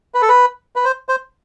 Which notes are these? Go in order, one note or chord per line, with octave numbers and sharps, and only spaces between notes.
B4
A4
B4
B4
C5
C5